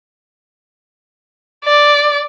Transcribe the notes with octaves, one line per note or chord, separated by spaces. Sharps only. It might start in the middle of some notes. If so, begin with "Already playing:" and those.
D5